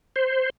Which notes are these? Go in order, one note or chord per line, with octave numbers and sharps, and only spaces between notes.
C5